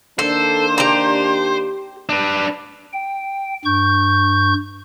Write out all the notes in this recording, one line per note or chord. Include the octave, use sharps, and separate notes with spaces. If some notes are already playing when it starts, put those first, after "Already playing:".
D#3 A#3 D4 A4 C5
G4 A#5
D4 B4
G5
G2 C#6 G6